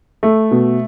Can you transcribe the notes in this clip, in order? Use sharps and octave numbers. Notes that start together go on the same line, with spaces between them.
A3
B2